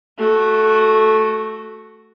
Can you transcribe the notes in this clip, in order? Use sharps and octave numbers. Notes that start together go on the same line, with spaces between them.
A3 F#4